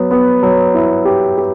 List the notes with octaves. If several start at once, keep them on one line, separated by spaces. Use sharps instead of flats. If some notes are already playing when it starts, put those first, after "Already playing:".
Already playing: F#3 B3
B3
F#3
E4
G4
G4